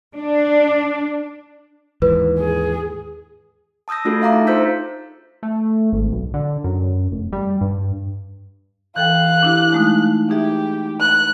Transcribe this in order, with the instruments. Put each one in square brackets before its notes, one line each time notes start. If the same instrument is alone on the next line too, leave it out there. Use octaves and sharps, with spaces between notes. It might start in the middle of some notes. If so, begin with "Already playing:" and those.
[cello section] D4
[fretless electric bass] D#2 G#2 E3 [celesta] B4
[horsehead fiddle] G#4
[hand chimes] A5 D#6 E6 G6 A#6
A3 D4 F4 F#4 G#4 A4
E5 F5 A#5 D6
D#4
D#4 F4 C5 E6 G6 B6
[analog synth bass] A3
G#1
B1
D3
F#2
F1
G3
G2
[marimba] E3 A4 G5 [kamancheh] F5 F#6
[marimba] D4 E4 G4
G#3 A3 D#4
[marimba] D#4 G#4 E5 [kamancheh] G4
[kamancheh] F#6